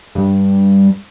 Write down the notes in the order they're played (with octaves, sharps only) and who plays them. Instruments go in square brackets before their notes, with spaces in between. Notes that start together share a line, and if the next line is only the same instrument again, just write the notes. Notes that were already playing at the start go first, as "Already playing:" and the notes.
[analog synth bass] G2